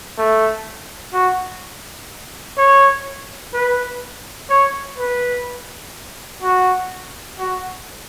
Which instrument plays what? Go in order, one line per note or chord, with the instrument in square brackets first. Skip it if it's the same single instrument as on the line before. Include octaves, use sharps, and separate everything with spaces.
[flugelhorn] A3
F#4
C#5
B4
C#5
B4
F#4
F#4